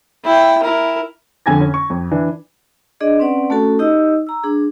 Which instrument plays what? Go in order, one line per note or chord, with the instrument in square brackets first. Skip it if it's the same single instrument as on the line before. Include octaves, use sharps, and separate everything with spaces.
[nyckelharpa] E4 G5
E4 A#4
[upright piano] F2 D3 G#5 G#6 A#6
C#4
C#6
F2
E3 D4
[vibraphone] D4 G#4 D5 D#5
C4 C#4 B4 D5 F#5
A3 C#4 F#4 A4 A5
D#4 G4 D#5 E6
A#5 E6
D4 G#4